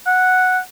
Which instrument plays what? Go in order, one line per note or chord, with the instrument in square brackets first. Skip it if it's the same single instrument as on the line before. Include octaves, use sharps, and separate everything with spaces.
[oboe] F#5